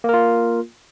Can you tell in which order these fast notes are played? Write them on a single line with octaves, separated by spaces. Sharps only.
A#3 A#4 F4